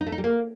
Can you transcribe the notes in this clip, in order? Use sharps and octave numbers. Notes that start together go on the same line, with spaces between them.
D#4
A3
D#4
G3
A#3